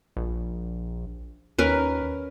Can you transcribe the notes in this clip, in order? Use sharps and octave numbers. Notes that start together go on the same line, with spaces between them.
A#1
D#2 C#4 A#4 B4